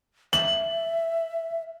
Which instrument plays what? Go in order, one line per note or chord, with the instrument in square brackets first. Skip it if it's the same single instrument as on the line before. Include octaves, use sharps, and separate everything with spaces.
[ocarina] E5 [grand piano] F#7